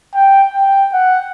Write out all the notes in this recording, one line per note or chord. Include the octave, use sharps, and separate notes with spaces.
G5
G5
F#5